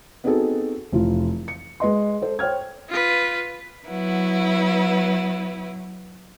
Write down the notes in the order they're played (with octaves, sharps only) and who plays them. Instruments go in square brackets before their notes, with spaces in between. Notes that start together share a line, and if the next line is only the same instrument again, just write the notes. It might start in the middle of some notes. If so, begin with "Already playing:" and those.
[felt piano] B3 C4 D#4 F#4 G#4 A4
F1 E3 F4
C#7
G#3 B4 D#5 C6
A4 C5
C5 C#5 G5 F6 G#6
[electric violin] F4 B4
[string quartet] F#3 B3 E4